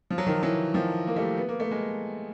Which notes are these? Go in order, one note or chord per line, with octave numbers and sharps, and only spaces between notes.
F3
F#3
D#3 F3
E3 F#3
D#3 F3
A#3
G3 A3
B3
A#3
A3
G#3 A#3